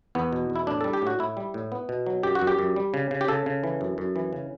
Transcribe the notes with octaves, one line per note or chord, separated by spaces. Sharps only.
E2 B3
B2
E2
E4
A2 D4
G3 A4
G4
A2 F#4
A2 E4
G3
A2
B3
B2
F#3
F#2 G4
F#4
F#2
G4
F#2
G3
C#3
C#3
G4
C#3 A4
C#3
E3
F#2
F#2
E3
C#3